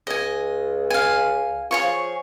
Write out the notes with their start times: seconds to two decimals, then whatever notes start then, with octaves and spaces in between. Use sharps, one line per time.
0.07 C#2 D#5 G#5
0.90 F5 G#5
1.71 F4 G#4 C#5 C#6
1.84 F3